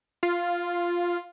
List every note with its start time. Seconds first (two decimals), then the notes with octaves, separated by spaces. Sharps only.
0.23 F4